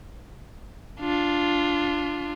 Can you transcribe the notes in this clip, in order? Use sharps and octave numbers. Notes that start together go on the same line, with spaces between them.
D4 F4